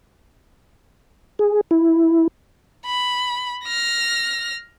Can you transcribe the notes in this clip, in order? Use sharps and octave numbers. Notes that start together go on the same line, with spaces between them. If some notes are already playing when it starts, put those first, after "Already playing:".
G#4
E4
B5
F6 A#6